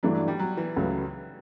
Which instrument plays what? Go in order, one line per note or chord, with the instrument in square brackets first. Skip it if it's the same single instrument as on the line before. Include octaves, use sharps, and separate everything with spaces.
[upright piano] G2 E3 A3 D4 [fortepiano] F#3
[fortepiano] F#3
G3
F#3
E3
[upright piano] C#2 C#3 F#3 A3